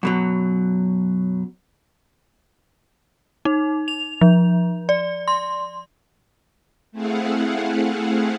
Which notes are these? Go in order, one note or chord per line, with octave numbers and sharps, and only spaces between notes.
F#2 B2 F#3
D#4
F7
F3
D5
C6
A3 C4 E4 G#4 F5 F#5